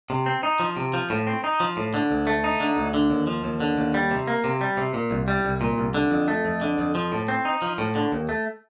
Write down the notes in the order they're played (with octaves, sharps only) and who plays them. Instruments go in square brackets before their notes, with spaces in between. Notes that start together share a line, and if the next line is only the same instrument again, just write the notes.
[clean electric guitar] C3
C4
D#4
F3
C3
F3
A2
C4
D#4
F3
A2
D3
D2
A3
D#4
D3
D2
D3
D#2
F3
D#2
D3
D#2
G3
C3
A#3
C3
G3
C3
A#2
C2
G3
C2
A#2
C2
D3
F2
A3
F2
D3
F2
F3
A2
C4
D#4
F3
A2
D3
D#2
A3